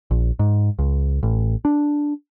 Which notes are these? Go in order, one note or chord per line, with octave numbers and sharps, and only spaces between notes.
A#1
G#2
C#2
A1
D4